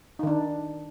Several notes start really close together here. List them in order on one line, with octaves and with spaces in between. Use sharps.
D#4 D#3 D4